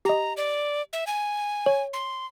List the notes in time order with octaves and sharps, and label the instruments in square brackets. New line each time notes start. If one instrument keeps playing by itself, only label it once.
[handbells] G4 D#5 [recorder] A#5
[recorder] D5
E5
G#5
[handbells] C#5
[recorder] C6